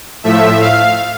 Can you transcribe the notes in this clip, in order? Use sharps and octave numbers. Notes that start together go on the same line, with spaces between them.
A2 F3 A3 E5
F5